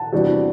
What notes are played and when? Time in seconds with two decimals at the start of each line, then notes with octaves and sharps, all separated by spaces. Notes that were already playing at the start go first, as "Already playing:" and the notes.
Already playing: F#5 A5
0.12 E2 C3 G3 D4 F#4